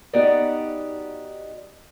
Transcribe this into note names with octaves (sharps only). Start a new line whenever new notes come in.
B3 D#4 F#4 G4 D5 D#5